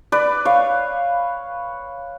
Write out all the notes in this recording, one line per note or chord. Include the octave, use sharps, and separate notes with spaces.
B4 D5
C#5 F5